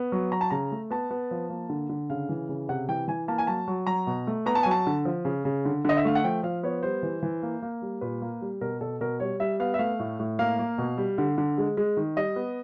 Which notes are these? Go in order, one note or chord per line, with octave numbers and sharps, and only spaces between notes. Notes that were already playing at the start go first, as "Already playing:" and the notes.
Already playing: B3
F#3
F#3 A#5
A5
C#3 A#5
A3
B3 A5
B3
F3
A#3
D3
D3
C#3 F5
E3
C#3
C3 F#5
E3 G5
E3 G#5
A#3 A5
G#5
F#3 A5
F#3
F#3 A#5
B2
A3
B3 A#5
A5
F#3 G#5
A5
D3
F3
C#3
C#3
D3
D3 D#5
E5
A3 F5
F#5
F3 G5
F3 F5
B3 C#5
G3 C5
E3
E3
A#3
A#3
G3
A#2 B4
A#3
G3
B2 A#4
B2 A4
B2 A#4
G3 C#5
G3 E5
B3 F5
E5
A3 F5
A2
A2
A#3 F5
A#3
B2
G3
D3
D3
G#3
G#3
D#3
G3 D#5
B3